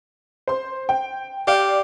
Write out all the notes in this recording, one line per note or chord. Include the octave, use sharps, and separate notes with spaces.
C5 C6
G5
G4 D5 F5